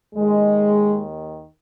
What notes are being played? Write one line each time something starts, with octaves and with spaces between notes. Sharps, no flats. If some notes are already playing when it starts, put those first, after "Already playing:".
D#2 D#3 G#3